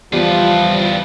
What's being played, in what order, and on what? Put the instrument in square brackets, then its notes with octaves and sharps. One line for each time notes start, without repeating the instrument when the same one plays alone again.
[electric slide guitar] E2 [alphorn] F3 [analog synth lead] G3 [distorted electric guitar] F4 B4